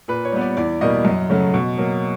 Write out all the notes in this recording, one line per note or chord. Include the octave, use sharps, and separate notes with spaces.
A#2 B4
C#5
G3 B3
D5
E2 D5
B2 G3 A#3 D#5
F#2
C#3 F#3 A3
B2
F#3 A#3